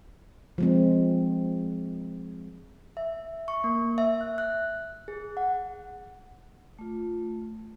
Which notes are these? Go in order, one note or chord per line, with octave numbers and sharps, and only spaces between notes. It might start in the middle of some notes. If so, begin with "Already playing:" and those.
F3 G#3 C4
E5
C#6
A#3
E5
F#6
F#6
G#4
F#5
A3 F4